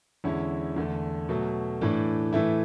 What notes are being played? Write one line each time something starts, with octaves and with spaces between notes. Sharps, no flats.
E2 D3 G#3 C#4 E4
E2 D3 A3
B2 F#3 A3
A2 E3 A3 D4
A2 E3 A3 E4